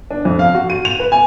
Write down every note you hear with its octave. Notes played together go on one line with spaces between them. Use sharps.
D4
F2
F5
F#4
D#7
F7
B4
G#5